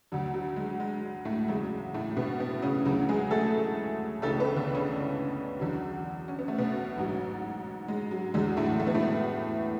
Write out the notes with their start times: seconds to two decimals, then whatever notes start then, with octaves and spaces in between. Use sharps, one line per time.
0.12 D2 D3 F#3
0.34 F#3
0.56 G#3
0.80 G#3
1.25 A2 A3
1.48 E2 C#3 F#3 G#3
1.94 A2 A3
2.17 B2 B3
2.40 B2 B3
2.62 C#3 C#4
2.85 D2 C#3 E3 F#3 F#4
3.09 G#3 G#4
3.31 A3 A4
4.22 C#2 C#3 E3 A3 A4
4.40 B3 B4
4.56 D3 D4
4.74 C#3 C#4
5.60 E2 D3 F#3
6.28 C#4
6.39 B3
6.48 A3
6.58 B2 B3
6.97 A1 G#2 F#3
7.88 G#3
8.11 F#3
8.34 E2 D3 F#3 G#3
8.57 A2 A3
8.80 A3
8.87 B3
8.95 A2 A3